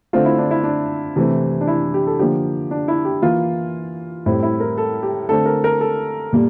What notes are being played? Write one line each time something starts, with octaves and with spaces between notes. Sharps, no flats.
D3 A3 C4 F4
E4
D4
E4
D4
C3 E3 A3 C4
D4
E4
G4
A4
D3 F3 A#3 G4
D4
E4
G4
E3 A#3 F4
A2 G3 C4 E4
E4
A#4
A4
G4
D3 A3 C4 A4
A#4
A#4
A4
A#2 G3 A#3